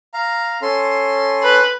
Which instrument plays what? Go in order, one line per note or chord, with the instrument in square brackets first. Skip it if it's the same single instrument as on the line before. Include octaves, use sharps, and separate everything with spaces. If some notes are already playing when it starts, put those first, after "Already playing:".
[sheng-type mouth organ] F5 A#5
C#4 A4 C6
[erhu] B4